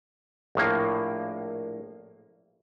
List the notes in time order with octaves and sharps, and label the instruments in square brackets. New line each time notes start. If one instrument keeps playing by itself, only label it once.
[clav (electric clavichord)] A#1 A2 A#3